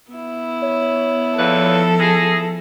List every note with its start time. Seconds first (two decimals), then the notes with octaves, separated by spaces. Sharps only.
0.11 B3 E4
0.62 C#5
1.38 E2 A#2 F3 A4 B4
2.00 G#4 A#6